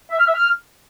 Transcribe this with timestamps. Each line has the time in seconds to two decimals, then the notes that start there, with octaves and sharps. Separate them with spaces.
0.11 E5
0.19 F6
0.27 E5
0.35 F6